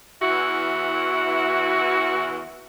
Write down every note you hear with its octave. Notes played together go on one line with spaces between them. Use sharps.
E2 E3 E4 F#4